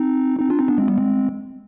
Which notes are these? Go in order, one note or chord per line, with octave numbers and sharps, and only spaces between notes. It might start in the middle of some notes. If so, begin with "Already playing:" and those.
Already playing: C4 D#4
C4 D#4
D4 F4
C4 D#4
B3 D4
G#3 C4
G3 B3
G#3 C4